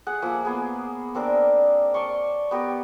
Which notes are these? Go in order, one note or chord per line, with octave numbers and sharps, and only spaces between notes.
G#4 F#5
F3 A#3 G#4 E5
A#3 B3 G#4
A#3 C4 D4 A#4
D5 A5 C6 C#6
B3 G4 A#4